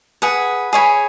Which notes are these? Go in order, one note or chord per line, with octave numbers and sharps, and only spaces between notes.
G#4 B4 F#5
G#4 C#5 G#5 B5